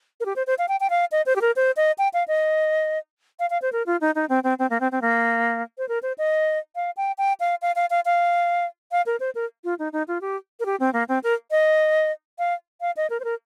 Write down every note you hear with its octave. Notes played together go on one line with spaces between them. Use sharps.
A#4
G4
C5
C5
F5
G5
G5
F5
D#5
C5
G4
A#4
C5
D#5
G5
F5
D#5
F5
F5
C5
A#4
F4
D#4
D#4
C4
C4
C4
A#3
C4
C4
A#3
C5
A#4
C5
D#5
F5
G5
G5
F5
F5
F5
F5
F5
F5
A#4
C5
A#4
F4
D#4
D#4
F4
G4
A#4
G4
C4
A#3
C4
A#4
D#5
F5
F5
D#5
A#4
C5
A#4